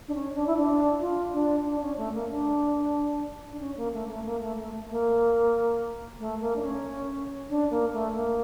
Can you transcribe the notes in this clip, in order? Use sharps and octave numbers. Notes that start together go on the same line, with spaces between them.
D4
C#4
D4
E4
D4
F4
D4
D4
C#4
A3
A#3
D4
D4
C#4
A#3
A3
A3
A#3
A3
A3
A#3
A3
A#3
D4
C#4
D4
A#3
A3
A#3